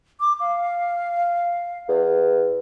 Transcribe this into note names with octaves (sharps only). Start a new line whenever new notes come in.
D6
F5
E2